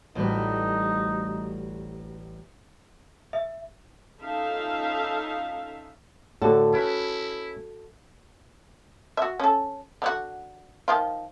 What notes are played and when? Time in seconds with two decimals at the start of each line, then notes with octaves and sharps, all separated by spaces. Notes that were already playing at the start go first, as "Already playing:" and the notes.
0.16 A1 D2 G3 D#4 B4
3.33 E5
4.20 C#4 D#4 F4 A4 E5 F5
6.42 A2 D3 F#4 A4
6.74 C#4 E4 B4
9.17 F#4 E5
9.40 C#4 A4
10.02 D3 D#4 F#4
10.88 D#3 F3 F4